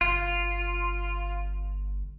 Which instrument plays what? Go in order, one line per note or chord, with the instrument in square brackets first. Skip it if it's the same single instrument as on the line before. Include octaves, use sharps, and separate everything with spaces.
[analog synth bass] G1 [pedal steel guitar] F4